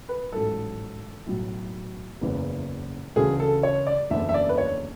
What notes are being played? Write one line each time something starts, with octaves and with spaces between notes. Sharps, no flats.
B4
A1 G#2 F#3 A4
B1 A2 F#3
F#1 E2 C#3 E3
D2 C#3 E3 A3 G#4
A4
C#5
D5
F#1 E2 D3 A3 E5
E5
D5
B4
C#5